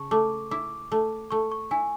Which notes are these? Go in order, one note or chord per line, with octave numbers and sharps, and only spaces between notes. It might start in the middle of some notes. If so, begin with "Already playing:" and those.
Already playing: C#3 A5 C#6
A3 D6
E4 D6
A3
A3 C#6
C#6
E4 G#5